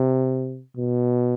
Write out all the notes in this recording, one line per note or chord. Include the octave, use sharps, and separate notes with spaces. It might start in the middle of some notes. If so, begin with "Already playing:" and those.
Already playing: C3
B2